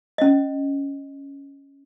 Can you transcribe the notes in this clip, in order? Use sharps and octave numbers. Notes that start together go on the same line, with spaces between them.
C#4 D#5